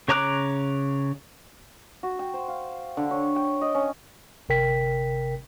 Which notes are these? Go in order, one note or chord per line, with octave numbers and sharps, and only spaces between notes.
C#3 C#5 A#5 D6 F#6
F#4
G5
C5
F5
D3
C#5
G5
D#5
C#4
G1 C3 A#4 G5 B6